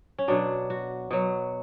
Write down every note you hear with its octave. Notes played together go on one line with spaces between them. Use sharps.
C#4
B2 F#3 D4
F#4
B2 F#3